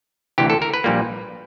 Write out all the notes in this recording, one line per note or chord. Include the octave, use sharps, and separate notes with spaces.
D2 C3 E3 G4
A4
A#4
B4
A#1 A#2 G3 A#3